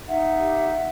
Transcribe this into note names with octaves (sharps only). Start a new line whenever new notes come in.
D#4 E5 F#5
G4